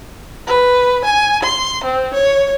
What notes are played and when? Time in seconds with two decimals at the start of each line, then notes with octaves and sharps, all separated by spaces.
0.47 B4
1.05 G#5
1.43 C6
1.84 C4
2.14 C#5